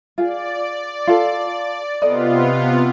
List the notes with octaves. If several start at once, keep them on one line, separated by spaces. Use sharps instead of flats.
F4 G#4 D5
F4 A4
C3 B3 F4 A4 D5 D#5